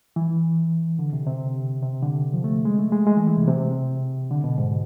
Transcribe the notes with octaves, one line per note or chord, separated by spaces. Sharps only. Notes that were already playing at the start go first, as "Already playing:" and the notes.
E3
D3
C3
C3
C3
D3
F3
A3
G#3
A3
G#3
G#3
E3
E3
C3
C3
D3
B2
G#2